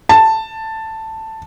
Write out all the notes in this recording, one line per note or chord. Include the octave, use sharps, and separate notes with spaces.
A5